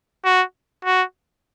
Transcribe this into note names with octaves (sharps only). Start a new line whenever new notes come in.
F#4
F#4